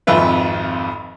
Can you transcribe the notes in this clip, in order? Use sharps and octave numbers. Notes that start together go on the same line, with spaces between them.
G#1 F2 F4 B4 E5